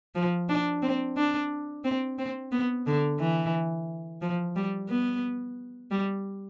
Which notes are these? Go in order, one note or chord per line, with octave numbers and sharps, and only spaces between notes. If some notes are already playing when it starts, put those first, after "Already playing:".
F3
D4
C4
D4
C4
C4
B3
D3
E3
F3
G3
B3
G3